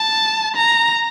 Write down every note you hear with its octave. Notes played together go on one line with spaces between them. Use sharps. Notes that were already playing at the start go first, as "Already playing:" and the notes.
Already playing: A5
A#5